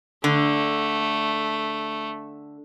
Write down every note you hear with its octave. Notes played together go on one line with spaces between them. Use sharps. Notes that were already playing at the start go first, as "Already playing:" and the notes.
D3 A3